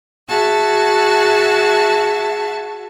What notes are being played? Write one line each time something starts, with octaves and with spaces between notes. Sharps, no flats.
F#4 G#4 E5 A5